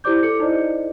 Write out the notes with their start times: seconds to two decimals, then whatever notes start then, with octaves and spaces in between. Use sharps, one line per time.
0.04 E4 G4 C5 D5 D6 G6
0.23 A4 C#7
0.40 D#4 E4 C5 D5 D#5